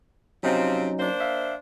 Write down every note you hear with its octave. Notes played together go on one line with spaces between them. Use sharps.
C3 F3 F#3 C4 C#4 D#4
A#3 D4 C5
E5 F5